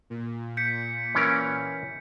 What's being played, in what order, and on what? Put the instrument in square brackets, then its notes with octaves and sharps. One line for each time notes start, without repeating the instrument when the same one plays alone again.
[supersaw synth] A#2
[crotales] G6 B6 C#7
[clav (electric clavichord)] E3 C#4 A#4